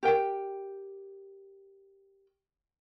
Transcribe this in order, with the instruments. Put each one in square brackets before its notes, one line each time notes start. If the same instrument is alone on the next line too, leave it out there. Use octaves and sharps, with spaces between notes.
[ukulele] G4 A#4 G5